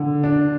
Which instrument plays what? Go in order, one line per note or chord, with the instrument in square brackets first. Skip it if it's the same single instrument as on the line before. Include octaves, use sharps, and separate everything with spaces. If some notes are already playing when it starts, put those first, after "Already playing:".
Already playing: [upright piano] D3
D4